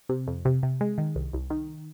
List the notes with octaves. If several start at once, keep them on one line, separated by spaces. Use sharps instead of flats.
C3
F2
C3
C3
G#3
D#3
C2
C2
D#3